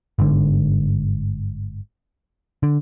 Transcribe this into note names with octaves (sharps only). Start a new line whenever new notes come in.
G1 G#2 D3
D3